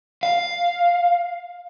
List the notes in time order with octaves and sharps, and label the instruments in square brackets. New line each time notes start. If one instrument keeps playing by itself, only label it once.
[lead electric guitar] F5